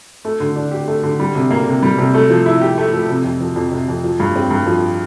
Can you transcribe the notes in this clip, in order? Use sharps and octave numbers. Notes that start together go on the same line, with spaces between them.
A3
D3
D4
G4
A3
D3
G3
C3
A#3
C3
G3
C3
A3
F3
E4
G4
A3
F3
C3
F2
F3
F2
C3
F2
F3
G2
C4
G2
F3